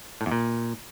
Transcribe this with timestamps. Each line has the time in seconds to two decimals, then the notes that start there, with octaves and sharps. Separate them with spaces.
0.21 A2
0.26 E2
0.31 A#2